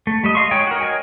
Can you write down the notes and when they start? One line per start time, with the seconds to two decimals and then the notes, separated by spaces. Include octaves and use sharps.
0.07 A3
0.24 G3 A3 D#5
0.35 D#5 F5 C6 C#6
0.51 G#3 D#4 C#5 G5 G#5
0.67 F#4 A#4
0.81 C#5 D#5 G5 G#5